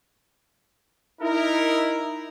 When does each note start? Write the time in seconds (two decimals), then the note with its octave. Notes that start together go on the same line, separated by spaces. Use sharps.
1.22 D#4 E4 A#4